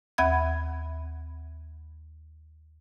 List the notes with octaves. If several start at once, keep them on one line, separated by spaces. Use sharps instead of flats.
D#2 F#5 B5 G#6